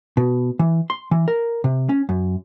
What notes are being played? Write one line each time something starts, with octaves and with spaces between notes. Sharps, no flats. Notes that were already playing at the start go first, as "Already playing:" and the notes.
B2
E3
C6
E3
A#4
C3
C#4
F#2